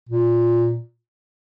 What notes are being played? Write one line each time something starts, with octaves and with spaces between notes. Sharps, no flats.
A#2